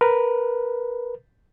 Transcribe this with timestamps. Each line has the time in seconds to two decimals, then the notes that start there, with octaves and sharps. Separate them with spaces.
0.01 A#4 B4